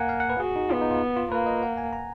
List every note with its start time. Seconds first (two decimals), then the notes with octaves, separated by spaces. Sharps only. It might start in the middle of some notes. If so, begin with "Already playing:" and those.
Already playing: A#3 F#5 G#5
0.09 F5
0.20 F#5
0.30 B4
0.40 F#4 G#4
0.56 D#4
0.70 B3 F4
0.81 D#4
0.90 F4
1.17 F4
1.32 A#3 B4
1.46 D#5
1.63 F#5
1.78 G#5
1.93 A#5